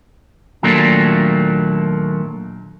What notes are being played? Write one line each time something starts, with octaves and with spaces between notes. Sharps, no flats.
D#2 A#2 F#3 A3 A#3 D4